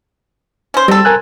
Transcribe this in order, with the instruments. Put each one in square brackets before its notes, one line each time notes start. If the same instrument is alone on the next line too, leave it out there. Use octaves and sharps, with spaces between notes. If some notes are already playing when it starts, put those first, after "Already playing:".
[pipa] C#4 C5
[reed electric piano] G3 [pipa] C4 A4
[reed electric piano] A#4 G#5 F#6